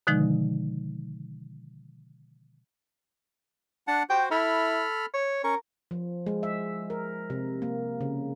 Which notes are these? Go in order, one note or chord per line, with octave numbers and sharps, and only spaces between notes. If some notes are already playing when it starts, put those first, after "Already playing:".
B2 D3 D#3 F3 G#3 D#4
D4 F#5 A5
F#4 C5 G5
E4 A4 B5 F6
C#5
C#4 A#4 C#6
F3
G#3
E5
A#4
C3
A#3
C#3